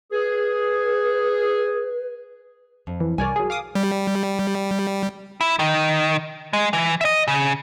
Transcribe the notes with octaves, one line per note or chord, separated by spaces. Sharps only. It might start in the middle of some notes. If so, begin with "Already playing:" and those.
G#4 B4
F2
E3
C2 A#4 C#5 D5 G#5
F#3 G#4
F5 D6 D#6
G3
E4
D#3
G#3
E3
D#5 E5
C#3